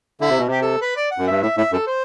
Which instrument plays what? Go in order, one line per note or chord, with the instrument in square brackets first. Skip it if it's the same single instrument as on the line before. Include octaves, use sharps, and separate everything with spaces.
[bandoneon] D3 [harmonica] E4
[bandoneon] C3
B2
[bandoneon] C3 [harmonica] G4
[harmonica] A4
B4
D5
F#5
[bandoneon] F#2
[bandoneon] G2 [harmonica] E5
[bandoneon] A2 [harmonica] E5
[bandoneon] A2 [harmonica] E5
[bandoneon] F#2 [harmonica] A4
[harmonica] C5